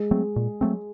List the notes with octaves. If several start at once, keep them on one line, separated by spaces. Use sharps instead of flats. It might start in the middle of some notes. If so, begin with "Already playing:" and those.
Already playing: G#3
F#3 A3 C4
A#2
F#3 A3 C4